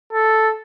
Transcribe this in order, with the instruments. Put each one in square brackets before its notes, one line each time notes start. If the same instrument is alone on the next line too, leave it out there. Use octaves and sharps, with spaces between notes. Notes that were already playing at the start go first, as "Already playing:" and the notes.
[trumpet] A4